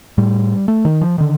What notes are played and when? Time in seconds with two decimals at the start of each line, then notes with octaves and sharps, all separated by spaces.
0.18 A2 G3
0.68 A3
0.85 D#3
1.01 F3
1.18 D3 D#3